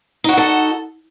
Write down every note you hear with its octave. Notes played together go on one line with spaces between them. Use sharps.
D#4 F#4 A4 F#5